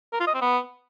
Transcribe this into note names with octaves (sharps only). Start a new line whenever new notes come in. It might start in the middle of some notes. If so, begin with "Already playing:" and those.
A#4
F4
D#5
C4
B3